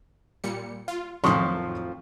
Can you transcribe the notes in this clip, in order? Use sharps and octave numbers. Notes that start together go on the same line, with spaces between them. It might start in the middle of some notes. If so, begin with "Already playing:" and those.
A#2 G3 C#7
F4
F2 A2 D#3 F3 F#3 C6 C#6 D#6